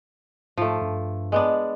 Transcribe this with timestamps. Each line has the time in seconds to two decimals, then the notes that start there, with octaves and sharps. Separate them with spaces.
0.58 G#2 F3 A3
0.82 G2
1.32 G#3 B3 D4